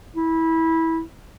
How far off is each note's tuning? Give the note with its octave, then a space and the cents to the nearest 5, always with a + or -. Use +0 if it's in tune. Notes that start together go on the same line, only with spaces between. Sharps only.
E4 -20